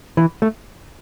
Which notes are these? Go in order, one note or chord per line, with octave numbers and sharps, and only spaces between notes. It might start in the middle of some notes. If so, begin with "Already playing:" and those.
E3
A3